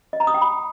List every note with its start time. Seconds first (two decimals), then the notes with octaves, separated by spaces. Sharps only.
0.13 D#5
0.20 A#5
0.27 D#6
0.34 G5
0.41 B5